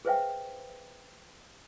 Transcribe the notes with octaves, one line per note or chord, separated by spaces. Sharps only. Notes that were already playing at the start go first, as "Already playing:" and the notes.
G#4 B4 C5 E5 F5 G5